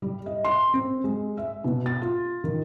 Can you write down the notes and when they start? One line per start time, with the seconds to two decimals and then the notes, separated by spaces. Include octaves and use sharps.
0.02 G3
0.26 D#5
0.45 C6
0.74 C4
1.04 G#3
1.37 E5
1.64 B2
1.86 A6
2.02 F4
2.44 D#3